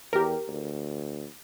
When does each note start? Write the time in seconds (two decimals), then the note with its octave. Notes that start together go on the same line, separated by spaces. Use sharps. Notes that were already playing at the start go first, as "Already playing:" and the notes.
0.13 E2 G4 A#4
0.48 D2